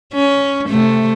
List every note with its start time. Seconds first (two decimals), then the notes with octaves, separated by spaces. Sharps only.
0.13 C#4
0.69 C3 A3